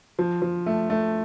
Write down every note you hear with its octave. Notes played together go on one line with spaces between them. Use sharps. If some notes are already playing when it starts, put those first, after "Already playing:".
F3
F3
A3
A3